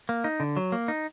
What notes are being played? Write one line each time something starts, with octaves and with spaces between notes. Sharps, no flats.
A#3
D#4
D3
F#3
A#3
D#4